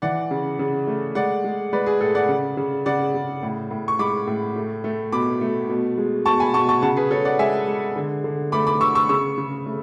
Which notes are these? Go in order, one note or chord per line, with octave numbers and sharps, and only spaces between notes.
E3 D5 F#5
C#3
C#3
A3
G#3 D5 F#5
G#3
G#3 B4 D5
G#4
A2 A4
D5 F#5
C#3
C#3
C#3 D5 F#5
C#3
A2
A2
C#6
G#3 B5 D6
A2
A3
A3
B2 B5 D6
A3
B2
G#3
B2 A5 C#6
G#5 B5
B2 A5 C#6
A5 C#6
C#3 F#5 A5
G#4 B4
C#3 A4 C#5
D5 F#5
G#3 E5 G#5
G#3
D3
D3
A3 B5 D6
B5 D6
D3 C#6 E6
C#6 E6
C#3 C#6 E6
C#3
A3